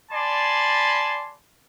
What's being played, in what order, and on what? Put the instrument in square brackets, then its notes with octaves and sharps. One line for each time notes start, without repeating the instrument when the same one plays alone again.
[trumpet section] D5 G#5 A5 B5 C6